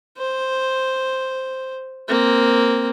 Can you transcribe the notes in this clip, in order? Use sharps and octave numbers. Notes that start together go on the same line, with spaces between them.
C5
A#3 C4